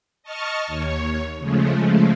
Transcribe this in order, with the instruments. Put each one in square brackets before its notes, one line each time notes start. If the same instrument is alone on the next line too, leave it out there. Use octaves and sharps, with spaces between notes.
[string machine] D#5 A5 C#6 F6
D#2 C#5
C#3 F3 G#3 A3